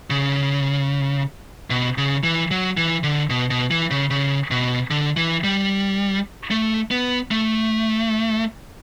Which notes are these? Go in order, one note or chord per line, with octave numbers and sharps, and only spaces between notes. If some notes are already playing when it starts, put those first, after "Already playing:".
C#3
B2
C#3
E3
F#3
E3
D3
B2
B2
E3
C#3
C#3
B2
D3
E3
G3
A3
B3
A3